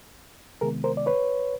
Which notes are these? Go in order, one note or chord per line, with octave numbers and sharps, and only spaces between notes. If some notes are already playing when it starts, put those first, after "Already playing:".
C3 D#3 G#3 B3 G#4 A#4
A#4 C5
D5
B4 C#5